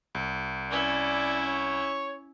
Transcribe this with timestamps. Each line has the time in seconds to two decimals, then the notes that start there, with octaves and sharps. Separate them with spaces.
0.15 C2
0.70 C#4 E4 D5
1.47 C#5